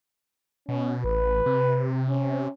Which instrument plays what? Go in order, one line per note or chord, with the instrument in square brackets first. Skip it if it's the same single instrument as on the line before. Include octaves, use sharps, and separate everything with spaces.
[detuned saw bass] B2 [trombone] C#4
[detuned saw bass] A1 [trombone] B4
[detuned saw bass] C3
[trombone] C#4